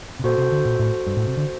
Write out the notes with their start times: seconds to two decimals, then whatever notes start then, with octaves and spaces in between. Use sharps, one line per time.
0.19 C3
0.24 A#2 F#4 A4 C5
0.38 C3
0.52 D3
0.65 A#2
0.80 A2
1.07 G2
1.17 A2
1.27 C3
1.37 D3